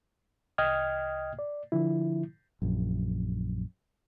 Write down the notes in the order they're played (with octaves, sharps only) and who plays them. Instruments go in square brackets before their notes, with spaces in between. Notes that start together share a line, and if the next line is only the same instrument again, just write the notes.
[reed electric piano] C2 D#5 G5 D#6 F6 G#6
D5
D3 F3 E4
[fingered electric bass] A#1 F#2